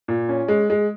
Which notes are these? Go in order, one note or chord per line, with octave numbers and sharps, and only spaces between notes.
A#2
C#4
G#3
G#3